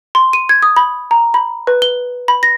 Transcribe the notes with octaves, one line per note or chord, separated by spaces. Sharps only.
C6
D#7
G#6
D#6
B5
A#5
B5
B4
G7
B5
A#6